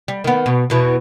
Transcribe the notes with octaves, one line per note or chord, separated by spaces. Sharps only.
G3
D#3 B3
B2
E2 B2 E3